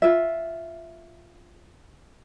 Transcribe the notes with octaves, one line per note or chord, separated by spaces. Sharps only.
F4 E5